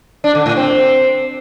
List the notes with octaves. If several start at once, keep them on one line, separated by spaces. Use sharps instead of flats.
D4
D3
A2
C4